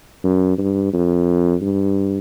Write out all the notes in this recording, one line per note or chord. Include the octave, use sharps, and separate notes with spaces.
F#2
G2
F2
G2